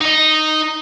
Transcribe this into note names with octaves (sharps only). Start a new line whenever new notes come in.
D#4 D#5